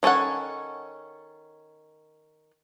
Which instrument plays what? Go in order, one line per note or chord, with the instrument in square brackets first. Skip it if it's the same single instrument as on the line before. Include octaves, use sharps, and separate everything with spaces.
[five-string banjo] D#3 C#4 A4 C#5 F#5